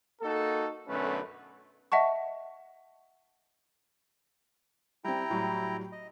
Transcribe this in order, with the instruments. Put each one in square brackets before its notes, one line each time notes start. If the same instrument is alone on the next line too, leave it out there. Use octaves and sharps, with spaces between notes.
[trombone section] A#3 D#4 F#4 A4
B1 F#2 D3 A3 C#4 B4
[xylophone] D#5 E5 F#5 A5 C#6
[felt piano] G3 C4 [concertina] E4 G5 A#5
[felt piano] A2 F#3 G3
[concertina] D#5